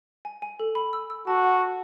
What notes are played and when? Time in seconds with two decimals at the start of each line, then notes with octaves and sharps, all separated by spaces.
0.25 G#5
0.42 G#5
0.60 A4
0.75 B5
0.93 E6
1.10 E6
1.27 F#4 A5
1.44 F#5
1.61 F#5